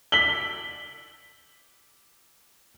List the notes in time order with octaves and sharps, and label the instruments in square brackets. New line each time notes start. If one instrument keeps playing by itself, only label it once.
[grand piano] B6 F#7 G7